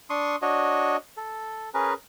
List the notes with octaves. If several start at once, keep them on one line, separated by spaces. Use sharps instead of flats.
D4 C6 C#6 D#6
D4 F#4 C#5 D#5
A4
C#4 G#4 A#4 B4